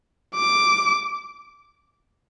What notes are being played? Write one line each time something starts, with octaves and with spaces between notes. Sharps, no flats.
D6